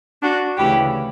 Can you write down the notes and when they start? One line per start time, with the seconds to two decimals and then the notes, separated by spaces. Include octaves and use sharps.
0.22 D4 F#4
0.57 D2 C#3 E3 E4 G4